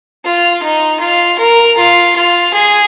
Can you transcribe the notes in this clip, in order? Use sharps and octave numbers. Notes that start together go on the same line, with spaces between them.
F4
D#4
F4
A#4
F4
F4
G#4